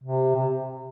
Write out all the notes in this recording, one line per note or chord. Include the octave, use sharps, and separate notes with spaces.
C3
C3